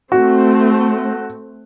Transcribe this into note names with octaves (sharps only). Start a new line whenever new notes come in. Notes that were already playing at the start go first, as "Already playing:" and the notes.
A3 C4 F#4